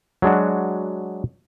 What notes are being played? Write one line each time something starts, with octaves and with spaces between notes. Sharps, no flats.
F#3 G#3 D4 F#4